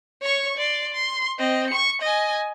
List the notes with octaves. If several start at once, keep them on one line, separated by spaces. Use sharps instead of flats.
C#5 C#6
D5 C6
C6
C4 D#5
C#6 C#7
D#5 G#5